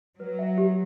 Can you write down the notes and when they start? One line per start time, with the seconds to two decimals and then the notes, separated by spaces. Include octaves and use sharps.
0.20 F#3 B4
0.39 E5
0.58 G4